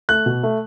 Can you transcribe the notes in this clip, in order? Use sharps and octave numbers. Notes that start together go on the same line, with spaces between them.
A3 F#6
B2
A3